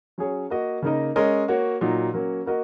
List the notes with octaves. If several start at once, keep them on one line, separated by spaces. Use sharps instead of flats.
F#3 C#4 G#4 C#5
A#3 F#4 D#5
C#3 A#3 D#4 A#4 D#5
G#3 C#4 A#4 D#5
A#3 F#4 C#5
A#2 F#3 D#4
F#3 A#3 C#4
A#3 F#4 A#4 D#5